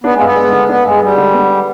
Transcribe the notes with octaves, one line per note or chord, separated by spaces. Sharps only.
B3 D4
G#3
G2 B3
G#3
D3
B3 D4
G2 G#3
G3 G#3
D3
B3